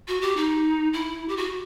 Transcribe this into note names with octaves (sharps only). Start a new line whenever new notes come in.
F#4
G4
D#4
E4
G4
F#4